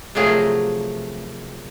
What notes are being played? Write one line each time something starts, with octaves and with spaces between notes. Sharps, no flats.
C3 F3 F#3 A3 G#4 A#4